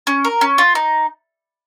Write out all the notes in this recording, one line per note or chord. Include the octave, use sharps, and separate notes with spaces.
C#4
A#4
C#4
F4
D#4